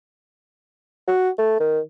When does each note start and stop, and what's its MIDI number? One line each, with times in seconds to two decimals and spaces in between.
1.08 1.30 66
1.39 1.57 57
1.60 1.80 51